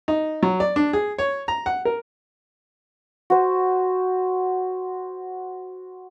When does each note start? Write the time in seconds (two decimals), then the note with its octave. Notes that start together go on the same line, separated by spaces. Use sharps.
0.08 D#4
0.43 F#3
0.60 D5
0.76 D4
0.93 G#4
1.18 C#5
1.48 A#5
1.66 F#5
1.85 A#4
3.30 F#4 C5